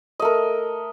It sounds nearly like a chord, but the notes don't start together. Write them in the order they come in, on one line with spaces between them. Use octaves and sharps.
D#5 A3 A#4